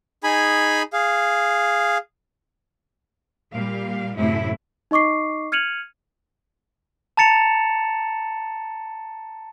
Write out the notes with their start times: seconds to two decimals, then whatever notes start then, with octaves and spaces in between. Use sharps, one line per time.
0.24 D#4 G#4 G#5 B5
0.93 G#4 F5
3.52 A#2 G3 F5
4.16 F#2 A2 C3 A3 E4
4.91 D#4 D#5 C#6 D6 C7
5.52 F6 G#6 C#7 D#7 F7 F#7
7.17 A5 A#5 A6 C#7 E7 F7